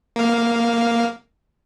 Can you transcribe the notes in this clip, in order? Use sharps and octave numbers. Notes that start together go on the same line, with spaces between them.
A#3 F5